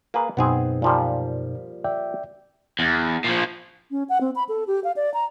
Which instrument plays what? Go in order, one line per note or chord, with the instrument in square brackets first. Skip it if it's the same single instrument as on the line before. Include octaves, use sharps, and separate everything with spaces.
[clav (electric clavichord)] A#3 G#4 B4
[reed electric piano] F#2 B2 D#4 [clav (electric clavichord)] B3 C4 G#4
[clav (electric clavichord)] A#2 F3 G3
[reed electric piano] D5 E5 G5
[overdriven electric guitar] E2
A#2 F3
[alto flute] C#4
F#5
C4
B5
A4
G4
F5
D5
A#5